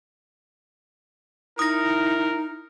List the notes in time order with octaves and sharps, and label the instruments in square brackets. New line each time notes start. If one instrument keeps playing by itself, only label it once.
[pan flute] D#4 [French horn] E4 [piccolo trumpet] A#4 [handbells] D#6 A#6